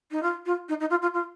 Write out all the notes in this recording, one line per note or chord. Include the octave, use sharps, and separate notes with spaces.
D#4
F4
F4
D#4
D#4
F4
F4
F4